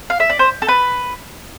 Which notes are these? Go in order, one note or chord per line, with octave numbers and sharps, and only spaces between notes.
F5
E5
D5
C5
A4
B4